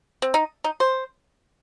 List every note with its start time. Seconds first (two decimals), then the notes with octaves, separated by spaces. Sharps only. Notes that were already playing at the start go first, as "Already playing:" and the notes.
0.22 C4
0.34 D#4
0.64 D#4
0.80 C5